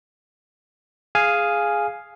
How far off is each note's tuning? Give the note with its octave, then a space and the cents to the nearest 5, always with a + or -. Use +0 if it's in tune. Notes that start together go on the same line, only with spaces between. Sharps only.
G#4 +0 F5 +0 G#5 +0